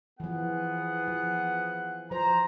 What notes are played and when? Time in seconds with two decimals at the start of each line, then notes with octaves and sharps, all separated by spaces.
0.20 E3 F3 B3 G#4 F#5
1.08 F3
2.11 F3 C5 A#5